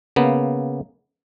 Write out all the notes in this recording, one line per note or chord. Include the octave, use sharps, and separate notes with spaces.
C#3 A#3 B3